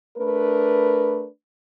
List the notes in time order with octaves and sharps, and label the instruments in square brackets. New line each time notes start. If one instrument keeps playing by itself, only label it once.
[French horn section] A3 D4 A#4 B4